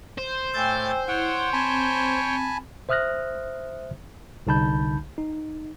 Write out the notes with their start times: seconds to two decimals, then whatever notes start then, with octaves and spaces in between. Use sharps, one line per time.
0.18 C5
0.54 A2 G5 G#5 E6 G6 A6
1.08 E4 C#5 F#5 G5
1.53 C4 G#5 A5 B5
2.89 C5 E5 D#6 F6 F#6 A#6
4.47 C2 D3 D#4 A5 B5 G6
5.18 D#4